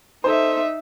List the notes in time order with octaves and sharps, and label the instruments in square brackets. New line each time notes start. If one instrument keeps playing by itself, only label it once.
[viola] D#4 E5 [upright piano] A4 C5